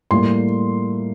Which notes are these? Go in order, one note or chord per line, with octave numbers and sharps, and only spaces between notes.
A2 G3 A#3 C6